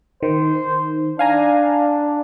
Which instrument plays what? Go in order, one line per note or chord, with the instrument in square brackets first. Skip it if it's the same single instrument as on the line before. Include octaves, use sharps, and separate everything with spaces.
[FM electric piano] D#3 [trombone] C5
[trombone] D4 [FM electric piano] F5 G#5 A#5